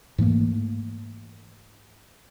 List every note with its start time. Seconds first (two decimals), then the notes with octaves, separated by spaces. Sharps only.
0.18 G#2 E3 A3 A#3